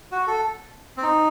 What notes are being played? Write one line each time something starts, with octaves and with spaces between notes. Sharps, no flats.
F#4
A4
C4
D#4